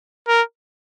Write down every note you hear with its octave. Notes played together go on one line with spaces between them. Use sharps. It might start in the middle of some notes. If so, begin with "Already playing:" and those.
A#4